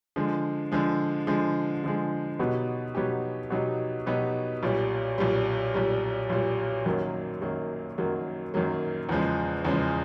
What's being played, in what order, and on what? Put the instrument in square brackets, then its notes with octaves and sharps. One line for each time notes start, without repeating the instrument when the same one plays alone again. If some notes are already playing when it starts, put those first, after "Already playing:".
[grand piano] D3 F3 G#3
D3 F3 G#3
D3 F3 G#3
D3 F3 G#3
B2 F#3 B3 D#4 G4
B2 F#3 B3 D#4 G4
B2 F#3 B3 D#4 G4
B2 F#3 B3 D#4 G4
B1 A#2 G3
B1 A#2 G3
B1 A#2 G3
B1 A#2 G3
F#2 D#3 F#3 A#3
F#2 D#3 F#3 A#3
F#2 D#3 F#3 A#3
F#2 D#3 F#3 A#3
E2 C#3 F3 G#3
E2 C#3 F3 G#3